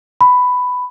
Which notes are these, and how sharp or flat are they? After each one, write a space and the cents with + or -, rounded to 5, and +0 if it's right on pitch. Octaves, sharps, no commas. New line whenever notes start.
B5 +10